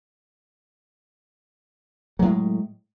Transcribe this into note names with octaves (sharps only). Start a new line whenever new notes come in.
A2 F#3 G#3